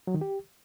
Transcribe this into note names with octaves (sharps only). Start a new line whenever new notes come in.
F#3
D#3
G4